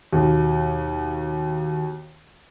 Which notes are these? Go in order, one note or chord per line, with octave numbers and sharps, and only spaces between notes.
D#2 B2